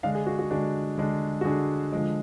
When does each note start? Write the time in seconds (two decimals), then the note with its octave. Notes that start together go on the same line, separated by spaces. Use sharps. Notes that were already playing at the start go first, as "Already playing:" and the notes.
0.03 D3 G#3 D4 F5
0.15 G#4
0.27 F#4
0.39 F#4
0.51 D3 G#3 D4 F#4
0.98 D3 G#3 D4
1.41 F#4
1.45 D3 G#3 D4 G#4
1.93 D3 F3 G#3